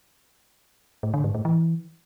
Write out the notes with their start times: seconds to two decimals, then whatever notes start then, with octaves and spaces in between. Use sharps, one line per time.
1.03 A2
1.14 D3
1.24 G#2
1.35 A2
1.45 E3